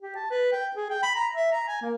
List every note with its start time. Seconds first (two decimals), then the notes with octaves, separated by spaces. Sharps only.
0.02 G4
0.16 A5
0.30 B4
0.52 G5
0.76 G#4
0.90 G5
1.03 B5
1.15 A#5
1.35 E5
1.52 A#5
1.68 G#5
1.82 A#3